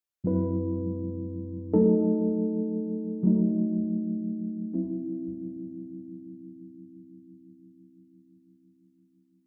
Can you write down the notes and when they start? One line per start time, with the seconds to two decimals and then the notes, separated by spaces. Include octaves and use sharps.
0.24 F#2 F#3 C4 E4 B4
1.74 F#3 A3 D#4 A4
3.23 F#3 A3 D#4
4.74 F#3 C4 E4